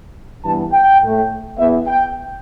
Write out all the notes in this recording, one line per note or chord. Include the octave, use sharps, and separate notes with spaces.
G2 E3 B3 A5
G5
A2 A3
E2 E3 B3 E5
G5